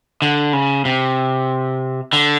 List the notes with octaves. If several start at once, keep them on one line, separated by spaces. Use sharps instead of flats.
D3
C#3
C3
D3